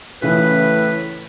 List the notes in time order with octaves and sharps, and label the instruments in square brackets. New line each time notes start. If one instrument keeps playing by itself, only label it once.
[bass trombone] A2 [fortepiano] C#3 E3 [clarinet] B4